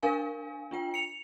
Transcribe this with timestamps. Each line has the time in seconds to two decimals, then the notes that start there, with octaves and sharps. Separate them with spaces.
0.03 D4 A#4 F5 G#5
0.71 D4 F4 G5
0.94 C#7 F7